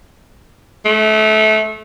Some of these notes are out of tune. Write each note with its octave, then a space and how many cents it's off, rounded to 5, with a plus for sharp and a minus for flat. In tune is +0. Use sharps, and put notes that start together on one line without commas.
A3 -25